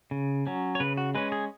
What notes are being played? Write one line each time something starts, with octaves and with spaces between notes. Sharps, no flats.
C#3
F#3 C#4
C#5
C#3 B4
F#4
G#3 C#4 B4
G#4